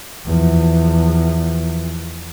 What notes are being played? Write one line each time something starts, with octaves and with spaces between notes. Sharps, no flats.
E2 F3